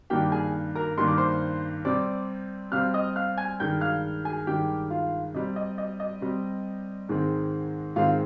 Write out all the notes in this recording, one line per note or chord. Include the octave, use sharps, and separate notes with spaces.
G2 D#3 A#3 G4 G5
G#4 G#5
A#4 A#5
G2 D#3 A#3 C6
D6
C5 C6
C3 G3 C4 D5 D6
C3 G3 C4 F5 F6
D#5 D#6
F5 F6
G#5 G#6
G2 D#3 G#3 G5 G6
F5 F6
G#4 G#5
G2 D#3 G#3 G4 G5
F4 F5
C3 G3 C4 D#5
D#5
D#5
D#5
C3 G3 C4
G#2 D#3 G#3 C4
G#2 D#3 G#3 C4 F4 F5